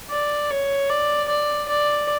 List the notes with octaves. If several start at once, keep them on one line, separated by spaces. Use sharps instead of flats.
D5
C#5
D5
D5
D5